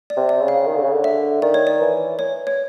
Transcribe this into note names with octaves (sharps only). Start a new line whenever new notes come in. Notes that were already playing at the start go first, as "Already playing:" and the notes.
D5
C3
D5
C#3
F5
D#3
D3
C#3
D3
E5
D#3 D5
C#5
D5
E3
C#5
C#5